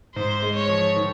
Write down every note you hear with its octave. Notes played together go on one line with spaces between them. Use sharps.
G#2 C5
G#3
C#5
F3
D#3